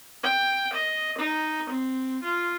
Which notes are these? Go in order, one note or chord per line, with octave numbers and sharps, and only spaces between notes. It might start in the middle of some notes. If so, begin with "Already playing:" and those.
G5
D#5
D#4
C4
F4